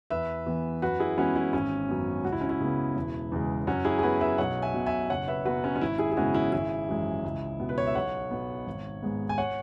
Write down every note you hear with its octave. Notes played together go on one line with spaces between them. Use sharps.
E2 B4 E5
E3 B3
F#2 F#4 B4
E4 G#4
E3 G#3 B3 C#4 F#4
E4
G#1 C#4
F#2 F#3 B3
C#2 F#4
E4
C#4
E4
C#3 G#3 B3
E1
E2 C#3 G#3
F#2 C#4 F#4
E4 G#4
G#4
F#3 B3 F#4 B4
B4 E5
B1 C#5 F#5
E5 G#5
B2 B3
E5 G#5
F#1 C#5 F#5
B4 E5
F#2 F#3 B3 F#4 B4
C#4
C#4
G#1 E4
E4 G#4
G#4
F#2 C#3 G#3 B3 C#4 F#4
E4
G#1 E4 G#4
F#2 E3 G#3
C#2
B2 B3
B4
C#5
E5
B1 C#5 F#5
B2 B3
G#1
G#2 G#3 B3
G#5
C#5 F#5